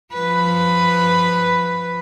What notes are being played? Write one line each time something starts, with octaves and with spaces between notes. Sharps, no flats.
F3 B4